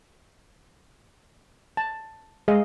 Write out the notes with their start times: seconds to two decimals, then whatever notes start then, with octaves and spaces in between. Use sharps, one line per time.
1.77 A5
2.48 G#3 G#4 D#5 F5